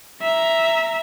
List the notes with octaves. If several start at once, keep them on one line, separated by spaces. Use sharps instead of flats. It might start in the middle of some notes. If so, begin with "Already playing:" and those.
E5 A#5